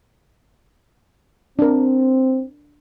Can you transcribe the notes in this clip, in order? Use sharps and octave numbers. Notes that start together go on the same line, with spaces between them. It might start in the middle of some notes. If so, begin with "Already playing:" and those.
C4 D4 A#4